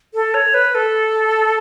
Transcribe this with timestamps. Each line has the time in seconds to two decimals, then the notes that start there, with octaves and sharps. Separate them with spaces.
0.14 A4
0.34 C#5
0.54 B4
0.75 A4